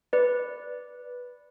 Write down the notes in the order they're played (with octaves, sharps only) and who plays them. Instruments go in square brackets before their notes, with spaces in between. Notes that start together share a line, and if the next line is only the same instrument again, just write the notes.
[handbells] B4 D5